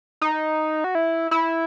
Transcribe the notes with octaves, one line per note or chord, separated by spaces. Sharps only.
D#4
F#4
E4
E4